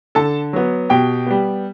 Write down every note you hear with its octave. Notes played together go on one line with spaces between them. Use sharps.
D3 A4 A5
F#3 B3
B2 G4 G5
G3 B3